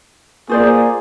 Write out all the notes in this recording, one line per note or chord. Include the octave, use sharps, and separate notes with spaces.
A#3 F4 G#4 C5 D5